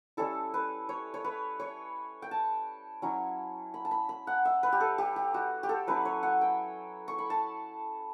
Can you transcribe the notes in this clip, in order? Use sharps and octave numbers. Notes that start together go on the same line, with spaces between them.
G3 C#4 E4 A4
B4
C#5
C#5
B4
C#5
G5
A5
F#3 C#4 E4
B5
A5
B5
B5
F#5
E5
B4
G4
A4
G4
G4
F#4
G4
A4
F#3 C#4 E4 B4
C#5
F#5
G5
C#6
B5
A5